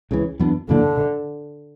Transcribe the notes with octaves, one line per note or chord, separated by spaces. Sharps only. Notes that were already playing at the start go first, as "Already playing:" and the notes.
C#2 C#3 E3
F#2 E3 B3 D4
F#2 D3 E3 A#3 D4